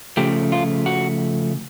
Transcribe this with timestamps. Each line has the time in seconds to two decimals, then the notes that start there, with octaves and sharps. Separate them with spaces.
0.17 C#3 F3 A3 G4
0.52 F4
0.86 F#4